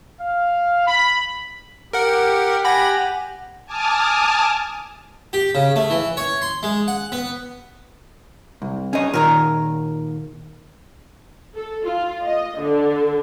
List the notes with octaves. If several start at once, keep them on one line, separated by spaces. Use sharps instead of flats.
F5
B5
G4 A#4 F#5
F#5 G#5 B5 A#6
G#5 A5 D6 D#6 F6
G4
C#3
A3
E3
C#5
C6
G#3
F#5
B3
C2
C#4 G#4 C#5 D#5
A#2 D#3 A#4 C#5 A#5
A4
F4
D#5
D3